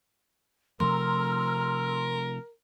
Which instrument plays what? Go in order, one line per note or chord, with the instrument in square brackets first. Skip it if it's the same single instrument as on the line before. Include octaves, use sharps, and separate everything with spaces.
[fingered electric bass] C3 F3 A3 [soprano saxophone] A#4 [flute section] A#5 E6 F6 [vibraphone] C6